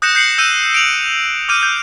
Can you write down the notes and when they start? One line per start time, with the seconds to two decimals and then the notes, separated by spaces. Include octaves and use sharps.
0.02 D#6 F#6 G6 A#6 C#7 E7
0.14 F#6 G6 C7 C#7 F#7
0.38 E6 G6 D#7 E7
0.74 D7 F7 F#7
1.49 D6 F6 G6 D#7
1.63 G6